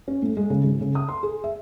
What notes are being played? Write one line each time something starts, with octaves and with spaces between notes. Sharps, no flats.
C#4
A2
G#3
C#3
G#1
C#3
D#6
C6
G#4
E5